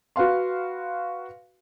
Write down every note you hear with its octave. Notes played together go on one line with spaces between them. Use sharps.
F#4 B4 F5 C6